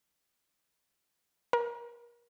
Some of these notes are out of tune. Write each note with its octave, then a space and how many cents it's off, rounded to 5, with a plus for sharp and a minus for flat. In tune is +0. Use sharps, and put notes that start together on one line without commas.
A#4 +30